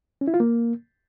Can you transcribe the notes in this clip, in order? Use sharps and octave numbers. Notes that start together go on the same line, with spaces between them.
C#4
E4
F4
A#3